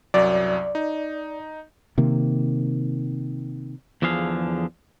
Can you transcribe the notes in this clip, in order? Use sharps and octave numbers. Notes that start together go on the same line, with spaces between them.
C2 F#2 F#3 D5
D#4
C3 D#3 A#3
E2 D3 F3 G#4 F5